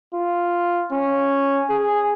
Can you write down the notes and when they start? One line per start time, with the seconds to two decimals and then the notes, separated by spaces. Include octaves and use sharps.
0.14 F4
0.92 C#4
1.70 G#4